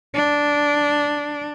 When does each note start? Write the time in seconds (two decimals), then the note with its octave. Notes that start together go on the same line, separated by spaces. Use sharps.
0.14 D4